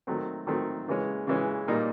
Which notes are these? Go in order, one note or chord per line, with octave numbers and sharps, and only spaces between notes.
D#3 F#3 A3 C4
D#3 F#3 A3 C4
C#3 E3 G#3 C#4
C#3 E3 G#3 C#4
A#2 G3 A#3 D#4